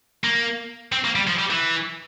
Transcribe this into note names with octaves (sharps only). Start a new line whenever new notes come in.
A#3
C4
A#3
G3
F3
G3
E3